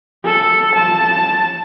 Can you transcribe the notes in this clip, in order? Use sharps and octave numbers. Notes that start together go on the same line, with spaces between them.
A4
A5